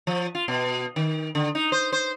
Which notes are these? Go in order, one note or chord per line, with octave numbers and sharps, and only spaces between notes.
F3
F4
B2
D#3
D3
D#4
C5
C5